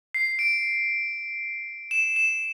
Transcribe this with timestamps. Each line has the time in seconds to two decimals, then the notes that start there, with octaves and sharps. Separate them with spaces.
0.14 C7
0.39 D7
1.91 E7
2.16 E7